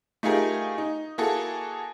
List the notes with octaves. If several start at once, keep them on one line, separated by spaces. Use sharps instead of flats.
A3 D#4 F4 G4 G#4 A#4
D#4
A#3 E4 F#4 G#4 A4